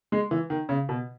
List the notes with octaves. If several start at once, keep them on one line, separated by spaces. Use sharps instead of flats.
G#3
E3
D#3
C#3
B2